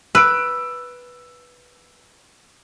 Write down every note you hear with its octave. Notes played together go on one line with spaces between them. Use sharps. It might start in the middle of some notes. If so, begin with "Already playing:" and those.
B4 E6 D7